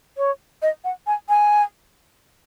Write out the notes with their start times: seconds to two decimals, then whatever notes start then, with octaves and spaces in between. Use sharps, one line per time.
0.18 C#5
0.62 D#5
0.84 F#5
1.07 G#5
1.29 G#5